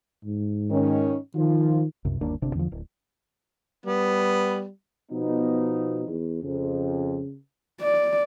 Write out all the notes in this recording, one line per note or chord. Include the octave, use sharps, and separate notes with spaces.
G#2
D#3 C#4
D#3 F3 F4
C2 F#2 C3
G1 D#2 A#3 D4
G1 C3 C4 D4
E2 D3 F3
D1
G3 B3
B2 F3 B3 D#4
E2
F2 C#3
D5